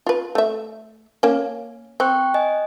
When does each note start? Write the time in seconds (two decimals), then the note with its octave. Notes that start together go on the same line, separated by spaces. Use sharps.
0.07 F4 B4
0.35 A3 E5
1.23 A#3 C#4
2.00 C4 G5 C#6 F#6
2.34 D#5 G#5